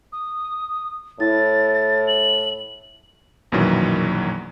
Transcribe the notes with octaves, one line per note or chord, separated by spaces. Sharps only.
D#6
A2 E4 A6
F#7
A#1 F#2 B2 D#3 E3 F#3